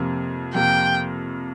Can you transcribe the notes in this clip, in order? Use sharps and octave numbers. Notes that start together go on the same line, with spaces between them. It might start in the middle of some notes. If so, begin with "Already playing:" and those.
Already playing: F2 C3 A#3
F2 C3 A#3 G5